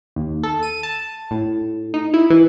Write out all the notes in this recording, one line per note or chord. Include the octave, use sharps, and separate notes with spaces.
D#2
A4
D#7
A5
A2
D#4
E4
E3